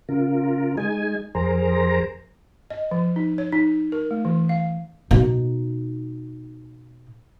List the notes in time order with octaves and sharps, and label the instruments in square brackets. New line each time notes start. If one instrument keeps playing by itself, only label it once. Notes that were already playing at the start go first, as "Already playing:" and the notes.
[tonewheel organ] C#3 F4 A#4
G#3 D#4 G#5
F2 G#4 A#4 C5 A#5
[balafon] D#5
F3
D#4
C#5
D#4
A#4
A3
E3
F5
[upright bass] B2 D#4